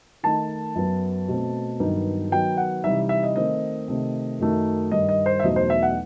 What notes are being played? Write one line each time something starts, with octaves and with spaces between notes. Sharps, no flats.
D#3 A3 D#4 A5
F#2 F#3 B3
B2 A3 C4
G2 D#3 F#3 B3 D#4
D#3 F#3 B3 D#4 G5
F#5
C3 E3 G3 D#4 E5
E5
D#5
D#3 A3 C4 D#5
C3 D#3 A3 C4
F#2 D#3 F#3 A3 D#4
G2 D#3 G3 D#5
D#5
C5
E5
E2 B2 F#3 A3 D#4 D#5
C5
E5
F#5